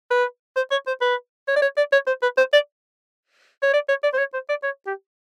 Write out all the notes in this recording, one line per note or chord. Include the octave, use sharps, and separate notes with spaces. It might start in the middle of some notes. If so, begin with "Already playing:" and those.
B4
C5
C#5
C5
B4
C#5
D5
C#5
D5
C#5
C5
B4
C5
D5
C#5
D5
C#5
D5
C5
C#5
C5
D5
C#5
G4